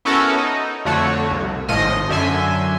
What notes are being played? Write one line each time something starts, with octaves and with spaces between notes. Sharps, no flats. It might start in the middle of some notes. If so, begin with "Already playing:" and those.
B3 C#4 E4 F#4 A4 A#4
D#4
F2 D3 A3 F#4 C#5
C2
G#1 A2 F3 D#5 C6
F#2 D3 E5 G#5 C6